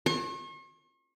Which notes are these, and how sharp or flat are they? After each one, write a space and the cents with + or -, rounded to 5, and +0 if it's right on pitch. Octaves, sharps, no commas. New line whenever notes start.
C#6 -45